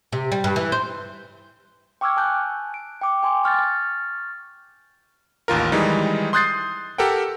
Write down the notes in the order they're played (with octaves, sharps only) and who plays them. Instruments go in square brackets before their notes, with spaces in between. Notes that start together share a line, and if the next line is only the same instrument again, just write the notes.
[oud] C3
G3
G2
E3
C5
[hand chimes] G5 C#6 D6 E6 F6 G#6
G#5 A5 F#6 G6
D7
G5 D6
G5 G#5 C6 D6
C#6 F6 G6 A6
[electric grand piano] A1 D#2 F4 A#4
D#3 E3 G3 G#3 D#4
C6 D#6 F#6 G6 A6 C7
G4 A4 A#4 F#5 G5